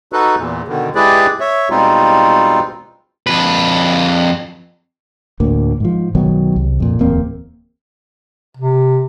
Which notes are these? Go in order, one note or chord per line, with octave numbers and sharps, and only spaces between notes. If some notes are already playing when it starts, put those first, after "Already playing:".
D#4 F#4 A4 B4
E2 A#2
B2 D3 D#3
G#3 E4 G4 G#4 B4 D5
C#5 E5
B2 G3 G#3 C4 D#4 F4
F2 B4
D2 A2 A#3
G#2 F3
B1 D#3 F#3 B3
C2
F2 A#2
D1 E2 A#3 C4
C3